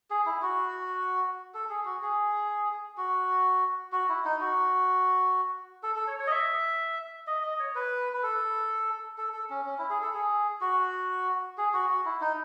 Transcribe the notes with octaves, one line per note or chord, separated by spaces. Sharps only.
G#4
E4
F#4
A4
G#4
F#4
G#4
F#4
F#4
E4
D#4
F#4
A4
A4
C#5
C#5
D#5
E5
D#5
D#5
C#5
B4
B4
A4
A4
A4
C#4
C#4
E4
G#4
A4
G#4
F#4
G#4
F#4
F#4
E4
D#4